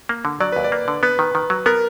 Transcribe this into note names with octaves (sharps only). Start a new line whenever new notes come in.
A#3
D3
F#3 D5
D#2 B4
D5
A#3
D3
B3 B4
D#3
D#3
F#3
B3 A#4